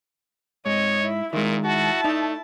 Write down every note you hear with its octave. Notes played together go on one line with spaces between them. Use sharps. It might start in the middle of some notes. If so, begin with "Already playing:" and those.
G#2 C4 C#5 D#5
E4
A#2 D#3 G#3 E4 A#4
E4 F#4 A5
A3 D#4 D5